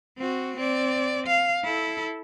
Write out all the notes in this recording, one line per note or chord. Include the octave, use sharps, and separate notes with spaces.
C4 F#4
C4 D5
F5
E4 A4